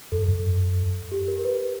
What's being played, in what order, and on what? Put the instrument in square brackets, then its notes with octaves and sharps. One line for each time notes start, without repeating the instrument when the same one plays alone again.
[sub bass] F#2 [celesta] A4
[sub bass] G2
F#2
[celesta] G4
A#4
B4